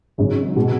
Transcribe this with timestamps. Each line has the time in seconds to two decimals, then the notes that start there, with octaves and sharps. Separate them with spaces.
0.18 G#1 F#2 C#3 G#3 D#4
0.56 B2 G#3